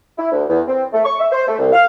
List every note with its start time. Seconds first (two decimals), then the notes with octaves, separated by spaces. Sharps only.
0.18 E4
0.32 D2
0.49 E2
0.67 C4
0.93 A3
1.04 C#6
1.19 E5
1.32 C5
1.47 A3
1.59 C2
1.72 F5